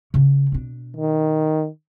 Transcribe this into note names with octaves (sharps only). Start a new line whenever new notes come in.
C#3
B2 D4
D#3